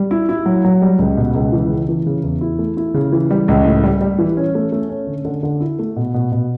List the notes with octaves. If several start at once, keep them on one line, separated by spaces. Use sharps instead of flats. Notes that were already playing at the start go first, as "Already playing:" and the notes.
Already playing: G3
E4
E4
F#3
F#3
G3
C#2
B2
C#2
E3
C#3
E3
C#3
E2
E4
A3
E4
C#3
E3
G3
C#2
A2
G3
G3
E3
C#4
A3
A3
C#4
D3
D3
D3
E4
A3
B2
B2
B2